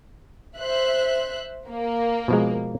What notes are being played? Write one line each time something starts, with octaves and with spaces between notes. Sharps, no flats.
C5 E5 F#6
A#3
B2 F3 G#3